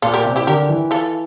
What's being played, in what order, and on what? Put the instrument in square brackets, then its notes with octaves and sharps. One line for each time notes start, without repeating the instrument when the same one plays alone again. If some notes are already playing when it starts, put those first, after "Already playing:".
[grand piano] A#2 [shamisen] F4 A4
[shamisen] G4 A#4
[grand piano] C3
[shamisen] E4 G4
[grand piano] D3 [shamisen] G4 A#4
[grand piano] E3
[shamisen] F4 A4